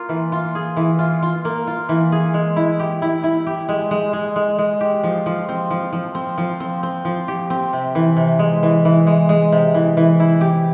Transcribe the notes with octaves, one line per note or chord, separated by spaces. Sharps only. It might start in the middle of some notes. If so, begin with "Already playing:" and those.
Already playing: A#3 F4
E3
F4
G#4
E3
F4
F4
A#3
F4
E3
G#4
G#3
E4
G4
E4
E4
G4
G#3
G#3
G#3
G#3
G#3
G4
F3
F3
C4
F3
F3
C4
F3
C4
C4
F3
G4
C4
C3
E3
C3
G#3
E3
E3
G#3
G#3
C3
E3
E3
E4
G4